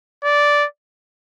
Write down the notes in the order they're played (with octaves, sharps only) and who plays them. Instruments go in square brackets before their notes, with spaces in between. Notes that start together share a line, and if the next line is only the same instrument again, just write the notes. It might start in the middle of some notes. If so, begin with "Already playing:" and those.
[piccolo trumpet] D5